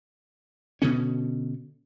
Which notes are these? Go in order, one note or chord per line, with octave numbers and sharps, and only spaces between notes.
B2 D3 C#4